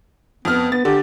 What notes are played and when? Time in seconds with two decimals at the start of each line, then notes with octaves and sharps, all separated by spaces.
0.45 F2 B3 F6
0.72 B3 A6
0.85 D3 G4